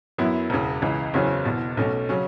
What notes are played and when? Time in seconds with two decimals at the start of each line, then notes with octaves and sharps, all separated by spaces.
0.18 F#2 F#3 B3 E4
0.50 E1 E2 C#3
0.82 C#2 C#3 E3
1.14 F#1 E2 C#3 F#3 C#4
1.45 F#1 E2 B2
1.77 B1 B2 A3 C#4
2.09 C#3 F#3 C#4